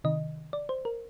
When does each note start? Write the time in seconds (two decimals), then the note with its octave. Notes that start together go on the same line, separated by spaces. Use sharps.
0.04 C3 D#3 D#5
0.53 D5
0.69 C5
0.85 A#4